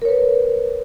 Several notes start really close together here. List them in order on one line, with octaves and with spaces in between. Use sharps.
A#4 C#5 B4